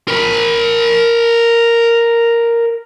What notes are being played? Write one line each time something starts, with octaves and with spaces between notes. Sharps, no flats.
A#4 B5